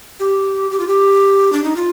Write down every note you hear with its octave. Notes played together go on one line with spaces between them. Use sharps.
G4
G4
F4
G4
D4
D#4
F4